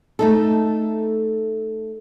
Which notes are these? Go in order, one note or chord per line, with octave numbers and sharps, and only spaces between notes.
A3 D#4 A4